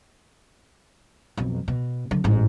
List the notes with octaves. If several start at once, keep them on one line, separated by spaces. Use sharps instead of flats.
B1 F2
B2
D3 F#3
A1 G#2